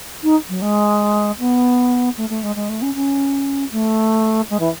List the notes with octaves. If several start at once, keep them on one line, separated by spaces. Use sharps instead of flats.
D#4
F#3
G#3
B3
A3
A3
G#3
G#3
A3
C#4
C#4
A3
G#3
E3